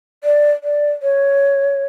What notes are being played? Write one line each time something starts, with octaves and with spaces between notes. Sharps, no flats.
D5
D5
C#5